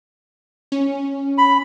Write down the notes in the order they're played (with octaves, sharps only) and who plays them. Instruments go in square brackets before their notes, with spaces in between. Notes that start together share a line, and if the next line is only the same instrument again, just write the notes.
[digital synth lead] C#4
[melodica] B5